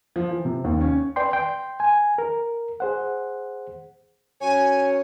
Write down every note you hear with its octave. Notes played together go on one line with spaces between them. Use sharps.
F3
E3
C3
D#2
C#4
B4 D5 G5 C6
G5 C6
G#5
A#4
G#4 C5 F#5
F#2 C#5 G#5